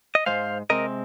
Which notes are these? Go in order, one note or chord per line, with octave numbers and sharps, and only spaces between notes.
D#5
G#2 F3 G#3 C5 F5
C3 G#3 C4 A#4 D#5